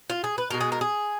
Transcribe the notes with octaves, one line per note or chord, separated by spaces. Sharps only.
F4
G#4
B4
B2 G#3 A#4
G#4
A#4
G#4